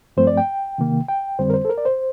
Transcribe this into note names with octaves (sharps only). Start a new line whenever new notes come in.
G2 F3 A3 C4 C5
D5
G5
C3 D#3 A#3
G5
F2 D3 G3 C4 C5
A#4
C5
A4
A#4
D5
C5